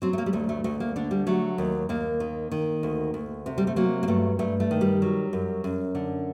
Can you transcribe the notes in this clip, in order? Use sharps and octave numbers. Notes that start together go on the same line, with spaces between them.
F#3 C4
A3
A#3
G3
D2 A3
A3
D2 A3
A#3
D3 D4
G3
F#3 A3
D#2
D#2 A#3
D#3
D#3
D2
D2
C3
G3
A3
F#3 A#3
A#3
G2 A3
G2 A3
A3
D#3
G3
F#3
F#2
F#2
D3